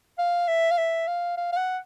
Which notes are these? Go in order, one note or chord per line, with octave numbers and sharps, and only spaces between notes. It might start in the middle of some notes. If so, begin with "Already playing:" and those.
F5
E5
F5
E5
F5
F5
F5
F#5